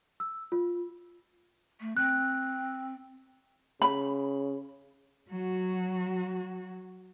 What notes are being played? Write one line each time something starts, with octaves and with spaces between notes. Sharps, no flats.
E6
F4
A3
C4 F#6
C#3 B5
F#3 F#4